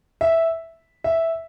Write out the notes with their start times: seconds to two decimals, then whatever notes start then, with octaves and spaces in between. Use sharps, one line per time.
0.21 E5
1.04 E5